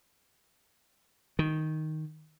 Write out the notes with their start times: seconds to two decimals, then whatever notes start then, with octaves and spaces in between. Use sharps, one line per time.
1.39 D#3